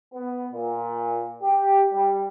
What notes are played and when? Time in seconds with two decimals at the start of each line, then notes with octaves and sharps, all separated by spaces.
0.13 B3
0.52 A#2
1.42 G4
1.92 G3